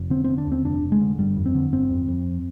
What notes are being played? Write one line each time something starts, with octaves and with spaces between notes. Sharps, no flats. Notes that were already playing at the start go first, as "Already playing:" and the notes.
Already playing: F1
D3 C4
D3 C4
D4
D#2 C4
F1 D4
F1
G#3
D3
G1 G3
F2
C4
D3
G1 C4
F2
F2